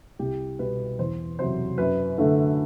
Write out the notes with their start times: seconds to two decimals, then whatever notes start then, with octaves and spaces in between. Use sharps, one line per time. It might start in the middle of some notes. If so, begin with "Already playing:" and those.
0.19 C2 G4
0.59 B2 G3 B4
0.99 E2 C5
1.39 C3 F#3 C5
1.78 F#2 B4
2.18 D3 A3